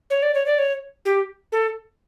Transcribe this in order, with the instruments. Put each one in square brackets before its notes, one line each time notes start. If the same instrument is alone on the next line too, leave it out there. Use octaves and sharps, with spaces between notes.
[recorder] C#5
D5
C#5
D5
C#5
G4
A4